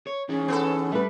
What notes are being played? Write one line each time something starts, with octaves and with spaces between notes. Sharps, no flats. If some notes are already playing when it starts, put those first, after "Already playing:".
C#5
E3 C#4 D#4 G#4
B3 A4
G3 A3 B4